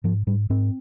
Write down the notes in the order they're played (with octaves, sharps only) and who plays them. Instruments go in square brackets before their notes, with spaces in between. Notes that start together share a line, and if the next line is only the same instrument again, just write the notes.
[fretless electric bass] G#2 F3
G#2 G3
G#2 C4